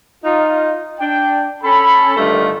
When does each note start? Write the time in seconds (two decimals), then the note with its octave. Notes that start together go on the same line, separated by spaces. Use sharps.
0.25 D#4 F4
1.00 D4 G5
1.63 C#4 A4 B5
2.17 G2 D3 D#3 A3 A#3 F4